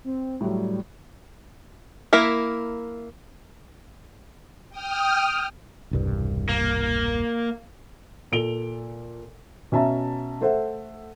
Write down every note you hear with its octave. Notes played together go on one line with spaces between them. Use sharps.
C4
A2 F#3 G3
A#3 E4 A#4 E5
G5 D#6 F6
E1 C2 G2
A#3
A#2 A4 D7 F7 G7
B2 C#4 E5 A5 A#5
A3 A4 C5 E5 F#5